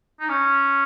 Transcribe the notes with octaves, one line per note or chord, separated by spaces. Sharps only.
D#4
C#4